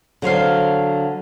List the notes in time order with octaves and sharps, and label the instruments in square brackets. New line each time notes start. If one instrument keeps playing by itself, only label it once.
[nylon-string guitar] D3 F#3 C5 F5